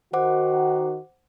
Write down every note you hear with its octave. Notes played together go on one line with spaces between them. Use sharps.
D#3 F#4 C5 F#5 D6